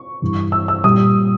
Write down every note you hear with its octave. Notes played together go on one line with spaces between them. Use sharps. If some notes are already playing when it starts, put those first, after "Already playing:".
Already playing: C#6
G2 E3 G3
E6
E6
A#2 G3 D#6